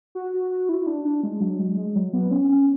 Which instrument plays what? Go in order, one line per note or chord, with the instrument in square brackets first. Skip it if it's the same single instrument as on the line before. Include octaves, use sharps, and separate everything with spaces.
[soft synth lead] F#4
F#4
F#4
E4
D4
D4
G#3
F#3
G#3
G#3
F#3
B3
C#4
C#4